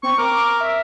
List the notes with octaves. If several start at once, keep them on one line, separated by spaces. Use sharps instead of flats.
C4 C#6
A#4 D6
E5